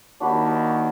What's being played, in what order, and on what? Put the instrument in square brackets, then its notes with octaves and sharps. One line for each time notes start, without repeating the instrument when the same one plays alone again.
[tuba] D#2 [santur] D4 F#4 B5